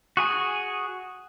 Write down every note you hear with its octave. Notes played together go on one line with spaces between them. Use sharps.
F#4 G#4 G#5